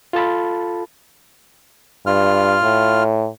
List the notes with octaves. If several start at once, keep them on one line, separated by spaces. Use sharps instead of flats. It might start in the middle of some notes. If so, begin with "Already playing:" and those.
F4 A4 A5 B5
G2 F4 F6
A2